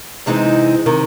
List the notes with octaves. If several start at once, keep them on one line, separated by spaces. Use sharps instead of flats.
C3 E3 G#3 C4 D#4
C3 D#3